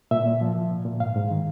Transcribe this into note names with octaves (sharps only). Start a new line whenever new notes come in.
A#2 E5
A#2
F3
F3
A#2
A#2
G#2 F5
G#2
D#3